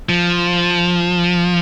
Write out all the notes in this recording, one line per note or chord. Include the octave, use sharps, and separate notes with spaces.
F3